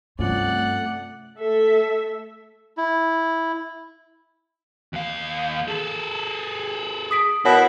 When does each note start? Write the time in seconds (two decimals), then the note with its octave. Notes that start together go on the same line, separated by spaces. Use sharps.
0.19 G2 C3 F3 A3 C#4 D5 F#5
1.38 A3 A4 E5
2.77 E4
4.93 D#2 F5
5.68 G#4 A4
7.11 D#6 B6 D7
7.45 B2 E4 A#4 C#5 F#5